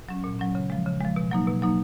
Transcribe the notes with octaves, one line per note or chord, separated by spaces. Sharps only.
F#3 C#4
A#2
F#3 C#4
C#3
F3 G#3
C#3
F3 G#3
B2
F#3 A#3 D#4
B2
F#3 A#3 D#4